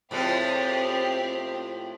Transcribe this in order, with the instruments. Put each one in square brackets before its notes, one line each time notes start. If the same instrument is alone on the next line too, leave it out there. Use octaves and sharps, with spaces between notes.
[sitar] A2 F3 G#3 [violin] C4 G4